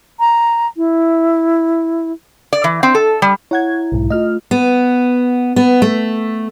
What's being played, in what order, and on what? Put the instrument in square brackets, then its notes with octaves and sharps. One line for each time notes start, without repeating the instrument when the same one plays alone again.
[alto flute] A#5
E4
[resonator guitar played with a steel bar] D5
E3
C4
A4
G3
[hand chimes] E4 [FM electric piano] C#5 F#5 G#6
[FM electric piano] B1 G#2
[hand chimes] A3 F4 [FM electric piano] D#5 F6
[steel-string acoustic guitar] B3
B3
A3